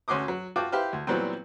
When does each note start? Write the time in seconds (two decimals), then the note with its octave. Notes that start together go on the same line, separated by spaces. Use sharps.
0.08 D2 C#4 F#4 C6 D6 D#6
0.28 F#3
0.56 F4 F#4 G5 A5 D6
0.72 E4 G4 B4 C5 F5
0.93 D2
1.07 A#2 E3 F#3 G3 B3 C4